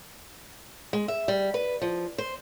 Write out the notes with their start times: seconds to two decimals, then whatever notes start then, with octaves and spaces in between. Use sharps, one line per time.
0.93 G#3
1.08 E5
1.28 G3
1.54 B4
1.82 F3
2.18 C5